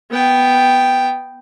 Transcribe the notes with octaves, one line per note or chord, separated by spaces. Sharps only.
B3 G5